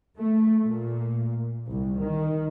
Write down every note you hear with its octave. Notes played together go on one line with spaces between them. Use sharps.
A3
A#2
C2
D#3